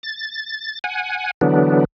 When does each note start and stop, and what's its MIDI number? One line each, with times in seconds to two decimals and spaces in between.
0.03 0.79 93
0.84 1.31 78
0.84 1.31 80
1.41 1.85 50
1.41 1.85 52
1.41 1.85 54
1.41 1.85 59
1.41 1.85 62